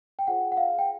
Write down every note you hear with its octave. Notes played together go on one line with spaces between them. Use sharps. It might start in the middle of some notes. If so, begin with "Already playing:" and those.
G5
F4 G#4 C5 F#5
F#5
F5
G5